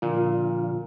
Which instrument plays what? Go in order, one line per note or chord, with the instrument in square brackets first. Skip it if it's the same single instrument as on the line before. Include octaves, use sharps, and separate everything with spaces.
[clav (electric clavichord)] A#2 [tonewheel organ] D3 F3 F4